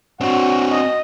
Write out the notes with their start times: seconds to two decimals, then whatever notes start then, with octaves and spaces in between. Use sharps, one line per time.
0.21 C4 D4 F#4
0.71 D#5